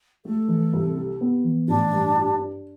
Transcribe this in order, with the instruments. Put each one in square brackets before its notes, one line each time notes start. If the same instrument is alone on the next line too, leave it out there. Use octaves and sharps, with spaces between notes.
[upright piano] A3 [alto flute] A4
[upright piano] E3
C2
C3
B3
E3
[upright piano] A1 [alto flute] D4
[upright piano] G2
G4
D4